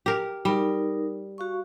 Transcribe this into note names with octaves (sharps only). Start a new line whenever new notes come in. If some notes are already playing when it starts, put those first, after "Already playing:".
G4 A#4
G3 D#4 A#4
F#4 F5 C#6